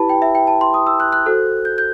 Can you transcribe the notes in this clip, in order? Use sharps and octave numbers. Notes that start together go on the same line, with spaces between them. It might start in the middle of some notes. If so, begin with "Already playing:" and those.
Already playing: E4 G4 B4 A5 B5
G5
E5
G5
A5
C6
D#6
E6
F#6
F#6
F#4 A4 C5
G6
G6